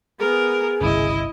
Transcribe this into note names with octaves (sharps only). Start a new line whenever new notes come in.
B3 G#4 A#4
G1 C2 C#3 E4 D#5